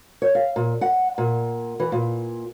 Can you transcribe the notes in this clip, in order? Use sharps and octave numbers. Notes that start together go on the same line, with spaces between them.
C#5
F5
A#2
F#5
A#2
E3
A#2